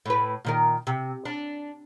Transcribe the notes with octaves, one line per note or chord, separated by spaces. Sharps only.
A2 B4
A#2 D#3 A#4
C3
D4